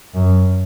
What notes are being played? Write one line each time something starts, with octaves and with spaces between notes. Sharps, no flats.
F#2